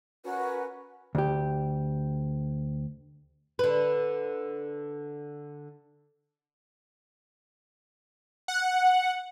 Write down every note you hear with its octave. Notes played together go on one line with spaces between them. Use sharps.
C#4 F#4 A#4 B4
D2 G4
D3 B4
F#5